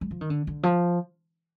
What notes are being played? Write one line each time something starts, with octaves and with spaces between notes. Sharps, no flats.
G3
F3
D#3
D3
D3
F3